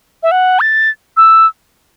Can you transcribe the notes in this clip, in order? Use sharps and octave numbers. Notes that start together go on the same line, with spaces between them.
E5
F#5
A6
E6